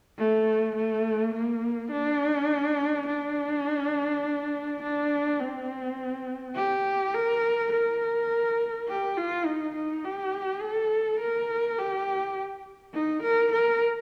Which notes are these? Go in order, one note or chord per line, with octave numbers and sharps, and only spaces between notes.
A3
A3
A#3
D4
D4
D4
C4
G4
A#4
A#4
G4
F4
D#4
D#4
G4
A4
A#4
G4
D#4
A#4
A#4